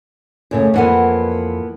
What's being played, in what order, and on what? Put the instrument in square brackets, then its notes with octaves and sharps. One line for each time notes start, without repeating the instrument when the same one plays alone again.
[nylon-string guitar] F#2 C#3 A3
[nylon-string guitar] F2 F#5 G#5 [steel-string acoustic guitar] E3 A#3 B3